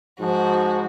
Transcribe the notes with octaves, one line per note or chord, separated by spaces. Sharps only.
G#2 F3 F#4